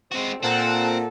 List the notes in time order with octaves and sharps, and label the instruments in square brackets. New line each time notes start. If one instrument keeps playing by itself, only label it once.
[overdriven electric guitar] G#3 F#4 [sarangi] C4
[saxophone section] A#2 [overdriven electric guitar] C4 [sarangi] A4 [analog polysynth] C5 F#5 A5